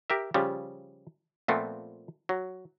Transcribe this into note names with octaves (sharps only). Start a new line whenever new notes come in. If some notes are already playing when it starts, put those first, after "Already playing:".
G4 A#4 E5
C#3 F3 G3
A#2 F3 A3 B3 C4
F#3